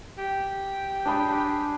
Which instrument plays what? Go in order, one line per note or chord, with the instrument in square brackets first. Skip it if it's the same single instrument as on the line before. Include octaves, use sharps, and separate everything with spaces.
[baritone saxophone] G4
[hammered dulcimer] D4 G#4 B5